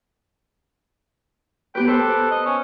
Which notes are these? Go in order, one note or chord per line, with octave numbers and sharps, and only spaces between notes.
B3 G4 B4 G5
A4 B4 C5 F#6
D#5
C#4